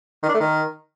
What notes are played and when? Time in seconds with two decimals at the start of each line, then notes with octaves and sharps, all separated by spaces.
0.23 D#3
0.29 D4
0.34 A3
0.40 D#3